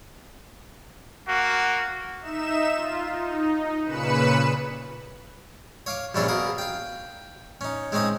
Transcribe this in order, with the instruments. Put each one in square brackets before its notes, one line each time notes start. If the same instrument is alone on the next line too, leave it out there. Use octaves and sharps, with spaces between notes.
[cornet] A#3 [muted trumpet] F#4
[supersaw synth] D#4 E5 E7
F4
D#4
A#2 C#3 B4 B5 C#7 E7
[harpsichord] C#5 F5 D6
A#1 G2 C#4 D4 A4 F5
B2 G#4 A#4 F5
F5 G5
C#4 D#4
G#3 C4 C#4 D#4 D#5